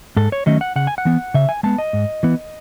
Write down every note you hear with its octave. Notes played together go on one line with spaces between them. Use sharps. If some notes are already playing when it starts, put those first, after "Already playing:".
G#2 A4
C#5
D#3 F#3 A3 C#4 D#5
F#5
C#3 F#5
G#5
F#5
E3 B3
C#3 E5
G#5
G#3 B3 A5
D#5
G#2
E3 B3